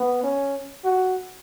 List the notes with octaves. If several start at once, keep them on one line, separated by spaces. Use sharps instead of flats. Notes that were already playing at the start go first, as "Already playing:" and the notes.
Already playing: B3
C#4
F#4